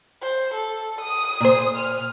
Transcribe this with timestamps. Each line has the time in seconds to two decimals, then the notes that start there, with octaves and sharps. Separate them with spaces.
0.22 C5
0.54 A4
1.01 D#6
1.40 A#2 C5
1.76 F6